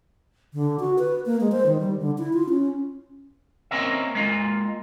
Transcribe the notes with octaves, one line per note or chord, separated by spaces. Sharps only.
D3
F#4
B4
A#3
G#3
C5
D#3
G3
D3
E4
F4
C#4
A#3 C4 C#4 A#4 D#5 E5
G#3 A#3 F4